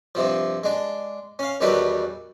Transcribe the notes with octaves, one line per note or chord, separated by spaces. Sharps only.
G2 C3 F3
G#3 D4
C#4 F5
E2 D#3 F#3 G3 D4 B4